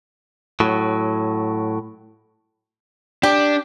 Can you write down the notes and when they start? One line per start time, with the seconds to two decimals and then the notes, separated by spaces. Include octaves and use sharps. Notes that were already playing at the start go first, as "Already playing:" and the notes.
0.60 A2 F#3
3.23 D4 G4